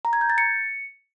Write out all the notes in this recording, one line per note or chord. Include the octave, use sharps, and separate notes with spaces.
A#5
G#6
G6
A6
C#7